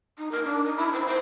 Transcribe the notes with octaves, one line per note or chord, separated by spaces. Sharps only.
D#4
A#4
D4
D#4
E4
C5
C5